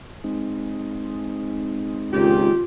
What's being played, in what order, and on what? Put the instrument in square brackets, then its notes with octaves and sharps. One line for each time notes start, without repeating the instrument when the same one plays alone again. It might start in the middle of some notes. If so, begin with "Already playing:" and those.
[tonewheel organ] G#3 C4 D#4
[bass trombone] C#2 [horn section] A#2 D#3 G4 [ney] F4